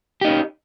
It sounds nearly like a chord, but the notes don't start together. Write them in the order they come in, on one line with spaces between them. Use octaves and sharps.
G4 D#4 C#4